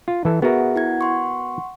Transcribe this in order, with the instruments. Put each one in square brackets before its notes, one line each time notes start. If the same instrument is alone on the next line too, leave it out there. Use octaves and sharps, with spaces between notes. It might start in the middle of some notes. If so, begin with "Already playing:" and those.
[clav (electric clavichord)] F4
E3 A4
[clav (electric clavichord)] B3 F#4 A#4 [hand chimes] G#4 E5
[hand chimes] E4 F#5 G#6
F#5 C6 C#6